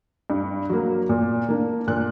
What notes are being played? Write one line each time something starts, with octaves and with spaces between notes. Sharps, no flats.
G2
F#3 A#3
A#2
A#3 D4
A#2 F#6